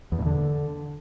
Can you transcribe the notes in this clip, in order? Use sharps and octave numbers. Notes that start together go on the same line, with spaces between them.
E2
A#2
D3